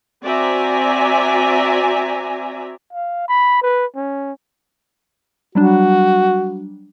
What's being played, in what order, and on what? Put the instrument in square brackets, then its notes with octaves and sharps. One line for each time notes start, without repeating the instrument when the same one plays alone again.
[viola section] C4 F#4 D5 E5 G#5 A#5
[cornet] F5
B5
B4
C#4
[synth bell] F#3 G3 D4 [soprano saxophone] F#4